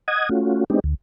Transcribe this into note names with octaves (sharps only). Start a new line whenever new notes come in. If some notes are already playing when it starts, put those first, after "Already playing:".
D#5 F#5 D#6 G#6
A3 C#4 F4 F#4
G#3 B3 C4 D4 D#4 G4
D2